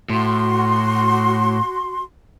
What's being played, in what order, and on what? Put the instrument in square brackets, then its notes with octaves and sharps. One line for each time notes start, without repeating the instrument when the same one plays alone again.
[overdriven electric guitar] A2 [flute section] F#4 C6